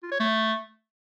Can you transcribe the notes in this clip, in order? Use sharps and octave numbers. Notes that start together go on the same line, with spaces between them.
F4
C#5
A3